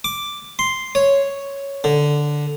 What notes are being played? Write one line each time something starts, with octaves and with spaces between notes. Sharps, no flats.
D6
C6
C#5
D3